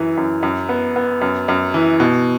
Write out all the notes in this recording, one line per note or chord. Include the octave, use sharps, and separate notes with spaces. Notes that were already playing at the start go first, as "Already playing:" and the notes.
Already playing: F#2 E3
F#2
F#2
B3
B3
F#2
F#2
E3
B2